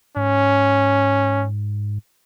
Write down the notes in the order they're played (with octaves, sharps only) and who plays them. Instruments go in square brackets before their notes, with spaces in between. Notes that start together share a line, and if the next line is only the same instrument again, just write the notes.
[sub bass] G#2 [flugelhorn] C#4